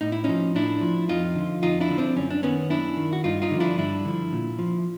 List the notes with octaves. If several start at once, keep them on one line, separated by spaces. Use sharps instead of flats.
A2 D#4
E4
F3 C#4 D#4
A2 D4 E4
F3
F2 D#4 F4
D3 F3
F2 D#4 F4
D4 E4
D3 F3
C4 D4
F#2 C#4
D4
D#3 B3 C#4
F#2 D4 E4
D#3
F#4
G2 D#4 F4
D#4 F4
D3 F3
D4 E4
G2 D4 E4
D3 F3
A#2
F3